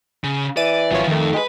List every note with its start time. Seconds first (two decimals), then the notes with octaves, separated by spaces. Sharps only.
0.24 C#3
0.57 E3 D5 E6 A6 D#7
0.91 G#1 F3 F#3 F4 C#5
1.07 F2 D#3 A3
1.34 G#3 G4 B4